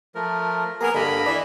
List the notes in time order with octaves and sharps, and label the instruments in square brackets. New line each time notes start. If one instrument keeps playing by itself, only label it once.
[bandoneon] F3 A3 A#4
[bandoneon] A#3 B3 G#4 [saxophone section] A#4
[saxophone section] G2 D3 A#3 [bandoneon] D#5 B5
[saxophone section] E3 B4 D5